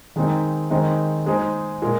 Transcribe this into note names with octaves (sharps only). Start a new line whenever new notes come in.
D#3 G#3 C4 D#4
D#3 G#3 C4 D#4 C5
G#3 D#4 G#4 C5
A#2 G#3 F4 A#4